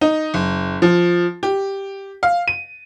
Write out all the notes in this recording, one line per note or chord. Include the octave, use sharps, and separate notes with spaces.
D#4
F#1
F3
G4
F5
D#7